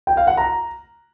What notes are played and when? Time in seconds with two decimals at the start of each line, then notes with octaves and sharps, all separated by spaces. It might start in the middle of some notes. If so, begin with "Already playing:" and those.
0.07 G5
0.17 F5
0.27 F#5
0.37 A#5